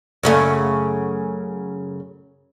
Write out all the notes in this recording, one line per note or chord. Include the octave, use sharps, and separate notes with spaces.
F#2 C#3 A3